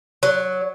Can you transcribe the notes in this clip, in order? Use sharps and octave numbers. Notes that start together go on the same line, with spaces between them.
F#3